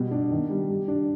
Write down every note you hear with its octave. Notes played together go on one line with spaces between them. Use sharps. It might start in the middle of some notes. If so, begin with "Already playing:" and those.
Already playing: B2 G3
D4
D#3
G3
G3
D4